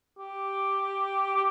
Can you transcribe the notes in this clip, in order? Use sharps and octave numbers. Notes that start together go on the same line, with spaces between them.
G4
G4